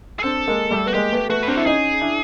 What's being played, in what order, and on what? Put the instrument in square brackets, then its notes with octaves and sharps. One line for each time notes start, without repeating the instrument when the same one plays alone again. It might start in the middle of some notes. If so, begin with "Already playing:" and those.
[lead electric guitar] G#4
[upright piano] C4 D4 [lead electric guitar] A4
[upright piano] G#3 A#3
G3 A3
[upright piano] B3 [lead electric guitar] F#4
[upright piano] G#3 A#3 [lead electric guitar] G4
[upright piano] A3 B3
[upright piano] A3 B3 [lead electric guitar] F#4
[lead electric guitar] B4
[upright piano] C4 D4 [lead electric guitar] A#4
[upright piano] E4 [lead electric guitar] A4
[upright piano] C#4 D#4 [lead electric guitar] G#4
[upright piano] D4 E4